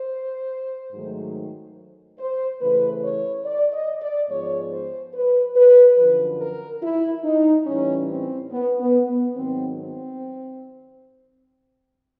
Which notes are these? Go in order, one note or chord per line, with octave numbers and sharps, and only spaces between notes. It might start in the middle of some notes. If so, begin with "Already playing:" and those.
Already playing: C5
G#2 D#3 F#3 A3
C5
C#3 E3 A3 B4
C#5
D5
D#5
D5
G#2 F3 G#3 B3 C#5
C5
B4
B4
F#2 D3 F3 B4
A#4
E4
D#4
A2 E3 G3 C#4
C4
B3
B3
B3
G#2 D#3 F#3 C4
C4